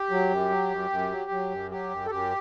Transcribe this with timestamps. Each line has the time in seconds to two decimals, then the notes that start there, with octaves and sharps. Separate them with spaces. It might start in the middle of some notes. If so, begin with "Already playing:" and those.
Already playing: G4
0.10 F#3
0.30 F#2
0.50 F#3
0.70 F#2
0.91 F#2
1.11 F#3
1.31 F#3
1.51 F#2
1.71 F#3 G4
1.90 F#2
2.06 A4
2.11 F#2 G4